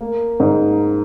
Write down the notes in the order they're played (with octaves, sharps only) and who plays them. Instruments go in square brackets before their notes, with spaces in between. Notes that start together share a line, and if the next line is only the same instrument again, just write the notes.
[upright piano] A#3
G#2